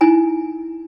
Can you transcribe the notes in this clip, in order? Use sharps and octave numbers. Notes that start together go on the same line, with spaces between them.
D#4 E4 G#5 A#5